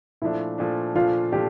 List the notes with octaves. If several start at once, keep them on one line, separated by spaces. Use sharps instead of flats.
A#2 F3 A3 D4 E4
A#2 F3 A3 D4
A#2 F3 A3 D4 F4
A#2 F3 A3 D4 G4